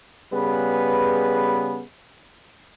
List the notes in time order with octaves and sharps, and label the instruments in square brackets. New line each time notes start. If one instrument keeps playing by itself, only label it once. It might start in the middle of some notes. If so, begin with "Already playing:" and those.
[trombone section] C#3 G3 B3 G#4 B4